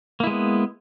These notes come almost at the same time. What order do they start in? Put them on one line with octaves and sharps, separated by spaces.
A#3 E4 G#3 B3